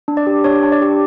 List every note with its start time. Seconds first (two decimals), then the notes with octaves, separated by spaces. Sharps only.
0.08 D4
0.17 D5
0.27 G4
0.44 D4 C#5
0.63 D4
0.72 D5
0.82 G4